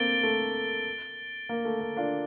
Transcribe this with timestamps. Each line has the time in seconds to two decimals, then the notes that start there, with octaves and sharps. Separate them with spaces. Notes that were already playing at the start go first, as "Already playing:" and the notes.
Already playing: A3 A#3 C4 A6 D7 G7
0.23 A3
1.49 A#3
1.65 A3
1.81 A#3
1.97 D4 F4